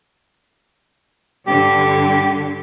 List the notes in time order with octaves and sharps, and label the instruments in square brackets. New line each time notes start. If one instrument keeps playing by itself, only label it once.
[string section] G2 D3 [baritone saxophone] G4